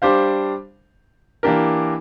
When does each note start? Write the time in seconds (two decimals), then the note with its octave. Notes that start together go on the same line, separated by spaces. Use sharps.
0.02 G3 D4 G4 C5 F5
1.43 E3 A#3 D4 G4 A#4